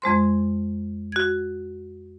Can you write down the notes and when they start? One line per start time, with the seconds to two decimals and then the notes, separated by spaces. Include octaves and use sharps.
0.02 F2 G#3 C5 C6
1.12 F#4 G#6